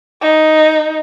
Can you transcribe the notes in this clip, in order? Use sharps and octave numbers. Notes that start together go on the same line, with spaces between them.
D#4